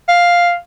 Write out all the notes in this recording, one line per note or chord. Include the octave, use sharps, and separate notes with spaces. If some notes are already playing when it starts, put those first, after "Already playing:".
F5